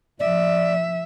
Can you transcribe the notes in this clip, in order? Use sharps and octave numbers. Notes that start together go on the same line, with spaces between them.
F3 D5 E5